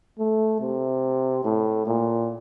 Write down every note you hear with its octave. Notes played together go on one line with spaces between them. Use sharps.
A3
C3
A2
A#2